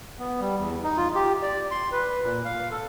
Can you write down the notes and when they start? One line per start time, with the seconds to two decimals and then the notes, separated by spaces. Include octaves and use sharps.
0.19 B3
0.40 G3
0.58 E2
0.84 D#4
0.98 F4
1.15 G4
1.42 D5
1.71 C6
1.92 B4
2.23 A#2
2.45 F5
2.71 A4